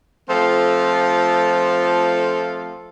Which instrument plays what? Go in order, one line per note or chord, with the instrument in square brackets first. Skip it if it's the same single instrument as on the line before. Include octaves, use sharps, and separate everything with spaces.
[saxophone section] F3 A3 C4 F4 A4 C5